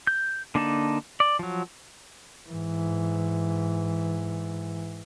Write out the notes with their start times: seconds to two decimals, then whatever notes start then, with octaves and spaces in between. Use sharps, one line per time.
0.07 G6
0.55 D3 A#3 D4 D#4 A5
1.20 D5
1.39 F3 F#3
2.49 G#2 E3